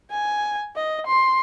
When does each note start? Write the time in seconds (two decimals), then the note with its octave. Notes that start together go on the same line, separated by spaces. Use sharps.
0.11 G#5
0.76 D#5
1.07 C6